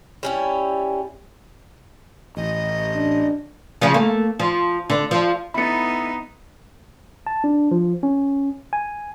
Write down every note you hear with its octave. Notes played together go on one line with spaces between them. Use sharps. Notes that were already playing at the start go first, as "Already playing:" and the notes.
G3 C#4 E4
A1 D#5
D4
C#3 F3
A3 A#3
F3
D3
F3
A3 B3 D#4 E4 B5 C#7
A5
D4
F3
C#4
G#5